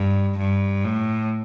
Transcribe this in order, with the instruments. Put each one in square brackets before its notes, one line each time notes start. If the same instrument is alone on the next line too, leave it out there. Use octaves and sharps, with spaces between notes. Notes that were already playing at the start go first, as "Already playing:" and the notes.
Already playing: [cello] G2
G2
A2